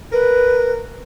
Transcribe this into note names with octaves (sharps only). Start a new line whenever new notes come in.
A#4 B4